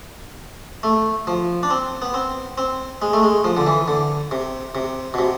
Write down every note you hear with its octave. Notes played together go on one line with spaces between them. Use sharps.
A3
F3
D4
C4
B3
C4
C4
G#3
A3
G#3
F3
D3
E3
D3
C3
C3
B2
C3